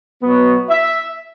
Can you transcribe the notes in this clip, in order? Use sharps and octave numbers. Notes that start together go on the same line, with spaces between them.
B2 F#3 B3
E5